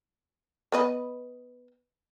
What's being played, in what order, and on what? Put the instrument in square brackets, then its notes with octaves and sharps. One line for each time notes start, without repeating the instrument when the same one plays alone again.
[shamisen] B3 B4 D#5